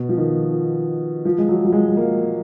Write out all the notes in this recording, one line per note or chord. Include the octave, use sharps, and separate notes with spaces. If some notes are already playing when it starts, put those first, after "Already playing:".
Already playing: B2
F3
D#3
F3
G#3
F#3
F#3
G#3
G#3
A#3